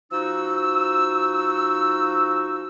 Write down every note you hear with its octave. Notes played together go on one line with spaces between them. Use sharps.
F3 D#4 F#4 E6